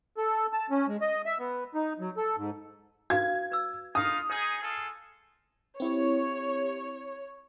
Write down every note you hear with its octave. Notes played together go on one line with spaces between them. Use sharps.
A4
A5
C#4
G#3
D#5
E5
B3
D#4
F#3
A4
G#2
F#4 B4 F5 G#6
B4 E6
D#4 F4 F5 D#6
D#4 G#4 C5
F4 G#4 A4
C4 E4 G4 C#5